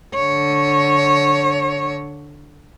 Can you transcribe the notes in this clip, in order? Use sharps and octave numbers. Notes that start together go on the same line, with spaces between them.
D3 C#5